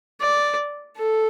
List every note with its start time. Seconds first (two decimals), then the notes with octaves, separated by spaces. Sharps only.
0.21 D5
0.97 A4